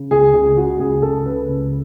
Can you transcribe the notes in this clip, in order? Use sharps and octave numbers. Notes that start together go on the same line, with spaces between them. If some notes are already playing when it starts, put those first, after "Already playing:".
Already playing: C#3
C#2 G#4
C#2 G#4
C#3 F#4
C#2 G#4
C#2 A4
C#3 B4
C#2